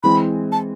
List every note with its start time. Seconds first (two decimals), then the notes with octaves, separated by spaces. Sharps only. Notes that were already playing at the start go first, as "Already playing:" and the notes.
0.03 E3 G#3 C4 B5
0.52 A5